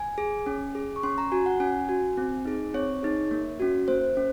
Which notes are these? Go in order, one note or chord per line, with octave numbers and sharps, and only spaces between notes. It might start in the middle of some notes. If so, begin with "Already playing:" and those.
Already playing: G#5
G#4
C#4
G#4
C#6
C#4 C6
A#5
F#4 G#5
F#5
C#4 G#5
F#4
C4
D#4 G#4
C4 C#5
D#4 G#4
A#3
C#4 F#4
A#3 C5
C#4